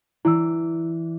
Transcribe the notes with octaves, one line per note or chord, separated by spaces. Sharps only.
E3 D4 E4 E6